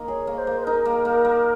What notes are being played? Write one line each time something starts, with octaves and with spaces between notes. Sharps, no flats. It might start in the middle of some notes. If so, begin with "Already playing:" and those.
Already playing: A#3 D#4
G#4 C#5
A#3
C#5
C5
A#3
C5
D#4 A#4
A#3
A#3
A#3